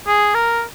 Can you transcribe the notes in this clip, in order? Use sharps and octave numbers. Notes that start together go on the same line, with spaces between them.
G#4
A#4